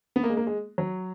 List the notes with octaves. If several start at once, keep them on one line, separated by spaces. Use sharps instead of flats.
B3
A#3
G#3
A#3
G#3
F#3